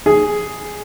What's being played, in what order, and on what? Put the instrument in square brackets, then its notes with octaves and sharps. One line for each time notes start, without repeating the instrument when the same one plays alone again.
[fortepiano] G#4